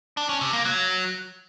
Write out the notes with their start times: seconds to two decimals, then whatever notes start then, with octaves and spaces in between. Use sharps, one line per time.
0.17 D4
0.29 C#4
0.41 C3
0.53 A#3
0.65 F#3